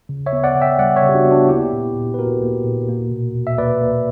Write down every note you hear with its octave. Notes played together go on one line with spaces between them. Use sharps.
C#3
C#5 E5
B3
D5 F#5
C#3
E5 G5
G3 D5 F#5
C#5 E5
C#3
G4
D4 F#4
B3
D4 F#4
A#3 E4 G4
A#2
A#2
B4
A#3 F#4 A#4
A#3
A#2
A#3
B2
B2
E5
A#3 B4 D5
A#3